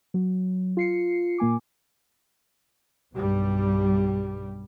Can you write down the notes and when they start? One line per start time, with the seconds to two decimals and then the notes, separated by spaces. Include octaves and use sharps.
0.14 F#3
0.77 F4 C7 C#7
1.38 A#2 A#3 G#5 D6
3.12 B1 G2 G3